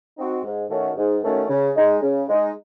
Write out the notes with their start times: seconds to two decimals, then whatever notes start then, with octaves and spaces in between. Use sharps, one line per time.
0.18 C4 D#4 F#4
0.44 G#2
0.70 D#3 A3 C#4 F#4
0.96 G#2
1.23 D#3 A3 C#4 F#4
1.49 C#3
1.76 G#3 D#4
2.02 C#3
2.29 G#3 D#4